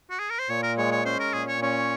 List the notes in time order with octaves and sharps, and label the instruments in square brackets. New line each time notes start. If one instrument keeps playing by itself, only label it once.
[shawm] F#4
G#4
A#4
C5
[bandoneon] A#2 [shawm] C#5
[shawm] A#4
[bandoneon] G#3 [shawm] C#5
[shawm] C#5
[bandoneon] C#4 [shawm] C5
[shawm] A#4
[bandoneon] A#2 [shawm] G#4
[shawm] C#5
[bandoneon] C#4 [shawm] C#5